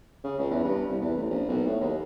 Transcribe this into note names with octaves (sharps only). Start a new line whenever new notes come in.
C#3
C#2
E2
G2
C2
E2
A1
A#1
B1
A2
D#2